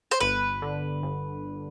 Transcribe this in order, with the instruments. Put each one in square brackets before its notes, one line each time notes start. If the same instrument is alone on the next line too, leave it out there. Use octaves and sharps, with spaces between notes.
[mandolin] C5
[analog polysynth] G1 [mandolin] B4
[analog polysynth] D3
G1